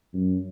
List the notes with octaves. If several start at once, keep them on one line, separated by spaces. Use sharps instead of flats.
F#2